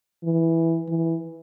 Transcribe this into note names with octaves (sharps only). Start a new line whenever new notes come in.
E3
E3